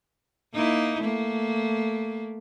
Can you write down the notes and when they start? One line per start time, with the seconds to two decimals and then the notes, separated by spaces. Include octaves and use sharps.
0.54 A#3 D#4 E4
1.02 A3 A#3